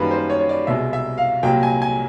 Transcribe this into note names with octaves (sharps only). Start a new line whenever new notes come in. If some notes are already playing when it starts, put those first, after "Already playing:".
Already playing: F#2 D#3 G3 A#3 B4
C5
C#5
C#5
D5
C2 B2 G#3 E5
E5
F5
C2 A#2 F#3 A#3 G5
G#5
G#5